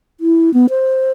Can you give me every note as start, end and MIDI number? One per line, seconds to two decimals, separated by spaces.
0.20 0.53 64
0.54 0.66 59
0.70 1.12 72